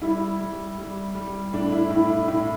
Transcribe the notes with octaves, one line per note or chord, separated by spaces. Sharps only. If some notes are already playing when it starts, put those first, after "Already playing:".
G3 E4
G3
G3
G3
A2 D4
E4
A2 E4
E4
A2 E4